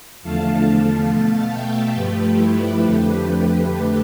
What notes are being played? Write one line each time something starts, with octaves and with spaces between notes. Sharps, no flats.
E2 D3 F3 A3 F5 A5
B2 A3 F5 A5
E5 G5
G2 F3 A3 G4 B4
E4 G4
F2 D3 F3 A3 G4 B4
F2 D3 A3 G4 B4